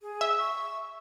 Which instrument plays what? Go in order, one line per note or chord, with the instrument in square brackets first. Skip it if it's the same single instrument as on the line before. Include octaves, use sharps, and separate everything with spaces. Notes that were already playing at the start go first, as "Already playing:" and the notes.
[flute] G#4
[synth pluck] E5
[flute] C#6